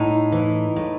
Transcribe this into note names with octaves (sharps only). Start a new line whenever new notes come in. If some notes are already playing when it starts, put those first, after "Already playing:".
Already playing: A2 D#4
E3
A2